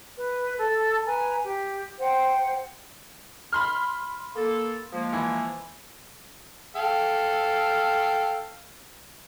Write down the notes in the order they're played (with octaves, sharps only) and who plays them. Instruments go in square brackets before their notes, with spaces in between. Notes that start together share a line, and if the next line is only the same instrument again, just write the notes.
[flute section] B4
A4
B4 G#5 A#5
G4
C5 F#5 G5
[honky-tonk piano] B5 C6 F6
[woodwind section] A#3 A4
F3 G#3 A#3
[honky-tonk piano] E3
[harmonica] A4 F5 G5